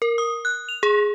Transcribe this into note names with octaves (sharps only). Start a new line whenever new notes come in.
A#4
D#6
F#6
F7
G#4